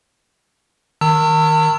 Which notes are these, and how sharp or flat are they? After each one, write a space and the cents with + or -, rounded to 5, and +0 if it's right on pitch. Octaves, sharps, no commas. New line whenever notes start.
D#3 +0 A5 +45 E6 +0